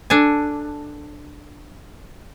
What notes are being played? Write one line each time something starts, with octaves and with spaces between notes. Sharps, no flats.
D4 A4 G#5